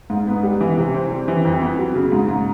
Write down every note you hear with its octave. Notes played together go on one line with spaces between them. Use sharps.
G#2
B3
G3
E3
C3
C4
G3
E3
F2
B3
F#3
C#3
G#2
G#2